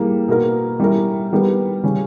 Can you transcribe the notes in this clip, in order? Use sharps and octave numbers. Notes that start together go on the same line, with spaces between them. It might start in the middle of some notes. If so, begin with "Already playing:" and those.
Already playing: E3 G3 A#3 D#4 G#4
B2 A#3 D#4 A#4
G3 C#4 E4 A#4
D#3 G3 B3 G4 A#4
C#3 G3 C#4